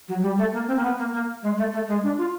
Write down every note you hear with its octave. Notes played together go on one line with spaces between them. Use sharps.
F#3
G3
A3
A#3
C4
A#3
B3
A#3
A#3
G#3
A3
A3
G#3
D4
F4